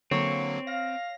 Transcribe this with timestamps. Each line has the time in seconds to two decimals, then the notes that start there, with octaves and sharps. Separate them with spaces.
0.11 D3 F#3 A#3 C4 C#5
0.67 F5 A#6